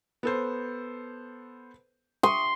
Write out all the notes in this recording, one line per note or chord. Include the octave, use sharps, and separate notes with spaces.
B3 A4 C5
C6 C#6 D#6